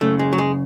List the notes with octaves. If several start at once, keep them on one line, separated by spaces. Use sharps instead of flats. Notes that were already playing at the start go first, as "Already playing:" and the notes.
F#2 C#3 A3
G#3
F#3
G#3